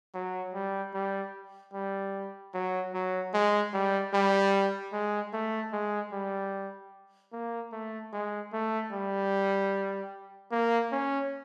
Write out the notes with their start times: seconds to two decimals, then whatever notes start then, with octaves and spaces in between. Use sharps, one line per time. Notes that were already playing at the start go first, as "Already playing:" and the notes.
0.14 F#3
0.54 G3
0.94 G3
1.73 G3
2.54 F#3
2.94 F#3
3.34 G#3
3.73 G3
4.14 G3
4.93 G#3
5.33 A3
5.73 G#3
6.13 G3
7.33 A#3
7.72 A3
8.13 G#3
8.53 A3
8.92 G3
10.52 A#3
10.92 C#4